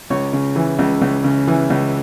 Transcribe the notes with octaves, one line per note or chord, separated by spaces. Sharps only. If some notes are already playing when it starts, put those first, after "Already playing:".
C#2 C#5
C#3
E3
C#2
C#2
C#3
E3
C#2